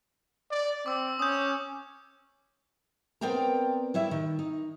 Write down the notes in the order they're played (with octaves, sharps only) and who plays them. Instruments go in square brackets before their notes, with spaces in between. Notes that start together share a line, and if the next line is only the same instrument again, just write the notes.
[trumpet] D5
[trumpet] C4 [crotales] D6 E6
[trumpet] C#4 [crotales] D#6 G6
[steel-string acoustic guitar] B3 C4 A#4 D5 G5 A#5
G3 E4 C#5 E5
D#3
D#4